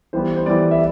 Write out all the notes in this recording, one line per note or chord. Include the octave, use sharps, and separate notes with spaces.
E3 G3 B3 C5
C5
E3 G3 B3 D5
E5